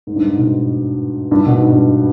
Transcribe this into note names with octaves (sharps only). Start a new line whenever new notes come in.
G#2
G2
G#2
B2
G2
B2
G#2
G2